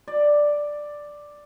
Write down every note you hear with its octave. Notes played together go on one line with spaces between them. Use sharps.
D5